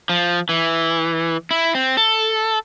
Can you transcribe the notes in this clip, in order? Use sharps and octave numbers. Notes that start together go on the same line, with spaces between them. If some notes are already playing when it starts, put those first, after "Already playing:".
F3
E3
E4
C4
A4